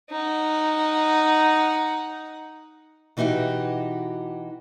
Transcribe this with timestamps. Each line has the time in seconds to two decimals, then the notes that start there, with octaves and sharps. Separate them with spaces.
0.11 D#4 F#5
3.17 B2 E3 D#4 F#4 G4